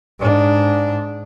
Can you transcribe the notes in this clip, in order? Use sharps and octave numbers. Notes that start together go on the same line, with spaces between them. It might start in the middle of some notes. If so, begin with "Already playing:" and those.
G#2 D4